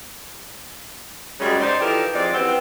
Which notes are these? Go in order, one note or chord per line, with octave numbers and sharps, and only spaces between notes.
F#2 C#3 G3 G#3
D#4 C5 D5
E3 F3 D#4 G4 A4 A#4
F3 G#3 C4 D#4 D5
E3 G3 B3 C4